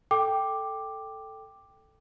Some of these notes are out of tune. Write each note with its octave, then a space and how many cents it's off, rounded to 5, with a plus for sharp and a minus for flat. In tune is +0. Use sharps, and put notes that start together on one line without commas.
A4 +0 G5 +0 D6 +5